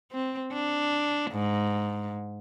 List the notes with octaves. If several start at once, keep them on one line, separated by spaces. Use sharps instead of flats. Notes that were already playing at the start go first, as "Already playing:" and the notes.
C4
D4
G#2